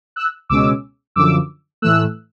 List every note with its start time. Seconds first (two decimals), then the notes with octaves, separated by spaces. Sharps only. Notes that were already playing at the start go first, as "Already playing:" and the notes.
0.16 E6 F#6
0.49 C#2 B2 G#3 C#4 D6 E6
1.16 F#2 D3 F3 D6 E6
1.82 A2 E3 A3 E6 F#6